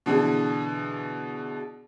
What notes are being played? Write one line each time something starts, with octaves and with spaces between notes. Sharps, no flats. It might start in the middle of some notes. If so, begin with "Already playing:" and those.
B2 D3 E3 G#4